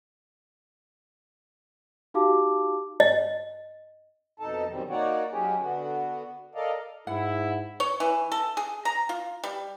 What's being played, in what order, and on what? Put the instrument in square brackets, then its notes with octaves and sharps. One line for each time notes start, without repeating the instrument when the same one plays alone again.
[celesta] D#4 F#4 G4 F5 A5 D6
[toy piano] D#5
[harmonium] F2 B2 D#4 A4 A5
F#2 B2 D#3 G3 C4
A#3 D#4 F#4 C#5 D5 F#5
F#3 G#3 C#4 G4 G#4
D3 B3 F#4
A4 A#4 D5 D#5 F5
[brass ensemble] G#2 E4 [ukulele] F#5
[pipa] C#5
E3
A4
G#4
A#5
F4
G3